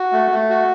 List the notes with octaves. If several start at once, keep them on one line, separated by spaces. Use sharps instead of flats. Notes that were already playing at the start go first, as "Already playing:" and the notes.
Already playing: F#4
A3
A3
F#4